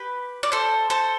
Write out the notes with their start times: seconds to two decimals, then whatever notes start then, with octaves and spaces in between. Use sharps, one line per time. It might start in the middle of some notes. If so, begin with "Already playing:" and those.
Already playing: G4 B4
0.43 D5
0.52 A4 C5
0.90 A4 C5